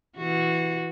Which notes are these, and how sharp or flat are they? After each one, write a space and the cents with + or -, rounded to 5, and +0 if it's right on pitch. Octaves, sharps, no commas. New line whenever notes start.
E3 +0 F#4 -10